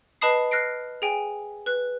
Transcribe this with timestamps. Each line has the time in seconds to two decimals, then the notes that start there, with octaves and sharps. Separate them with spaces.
0.21 B4 D#5 A5 B5 D#6 C7
0.51 F6 F#6 A#6 C7 D7
1.02 G#4 G5 G#5
1.66 B4 F#6